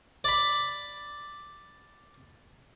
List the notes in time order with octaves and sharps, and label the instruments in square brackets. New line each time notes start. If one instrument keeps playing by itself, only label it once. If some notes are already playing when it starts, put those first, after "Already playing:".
[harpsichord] D5 B5